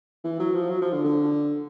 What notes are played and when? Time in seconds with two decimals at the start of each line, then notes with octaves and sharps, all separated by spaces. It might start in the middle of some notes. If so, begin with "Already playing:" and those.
0.24 E3
0.39 F#3
0.55 F3
0.70 F#3
0.81 F3
0.93 D3
1.04 D3